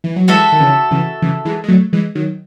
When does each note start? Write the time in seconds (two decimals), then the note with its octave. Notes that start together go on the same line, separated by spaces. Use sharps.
0.04 E3
0.16 F#3
0.28 E3 G#3 F#4 A4 E5
0.52 D#3
0.60 C#3 E3
0.91 C#3 E3
1.22 C#3 E3
1.45 E3 G#3
1.64 G#3
1.68 F#3 A3
1.93 E3 G#3
2.15 D#3 F#3